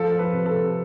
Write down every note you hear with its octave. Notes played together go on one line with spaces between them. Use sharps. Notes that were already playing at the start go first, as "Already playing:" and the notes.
Already playing: F3 A4
F3
B4
C3
A4
C3